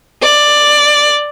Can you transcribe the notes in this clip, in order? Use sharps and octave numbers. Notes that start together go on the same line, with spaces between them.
D5